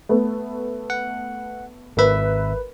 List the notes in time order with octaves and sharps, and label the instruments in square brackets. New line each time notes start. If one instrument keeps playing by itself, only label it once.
[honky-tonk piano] A3 B3
[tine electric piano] F#5
[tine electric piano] G#1 E5 [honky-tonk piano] A#4 B4